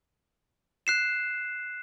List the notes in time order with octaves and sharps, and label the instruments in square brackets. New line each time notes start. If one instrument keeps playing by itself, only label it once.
[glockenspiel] F#6 C7 E7